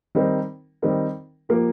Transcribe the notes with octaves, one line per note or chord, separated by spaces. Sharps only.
D#3 G3 C4 D#4 A#4
D#3 G3 C4 D#4 A#4
F3 A#3 G4 A#4